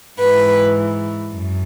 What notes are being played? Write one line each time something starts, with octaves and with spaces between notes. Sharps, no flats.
G#2 E3 B4
F#2